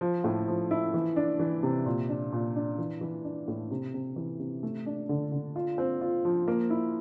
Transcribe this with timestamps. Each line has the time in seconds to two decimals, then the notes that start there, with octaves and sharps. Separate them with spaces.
0.01 F3
0.24 A2
0.48 F3
0.71 E4
0.94 E3
1.16 D4
1.39 E3
1.63 C3
1.86 A#2
2.09 D4
2.32 A#2
2.56 D4
2.78 E3
3.01 E3
3.24 D4
3.48 A2
3.71 C3
3.94 C3
4.16 E3
4.40 C3
4.63 A3
4.86 D4
5.09 D3
5.32 D3
5.56 F4
5.78 C4
6.01 F4
6.25 F3
6.48 A#3
6.70 E4